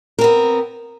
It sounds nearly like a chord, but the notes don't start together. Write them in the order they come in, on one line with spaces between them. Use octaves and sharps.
A#4 C4 B3